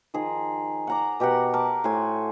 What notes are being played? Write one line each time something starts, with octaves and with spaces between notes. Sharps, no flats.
D#3 F3 G#4
F#5 A#5 D6
B2 G4 A#4 F#5
A#4 A5 D6
A2 C5 G#5 C#6